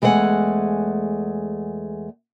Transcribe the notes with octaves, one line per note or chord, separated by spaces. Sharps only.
E2 G#3 A3 C#4 F#5 G#5